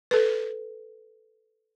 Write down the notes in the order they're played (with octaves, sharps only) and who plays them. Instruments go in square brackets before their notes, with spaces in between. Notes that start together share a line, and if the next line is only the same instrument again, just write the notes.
[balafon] A4 B4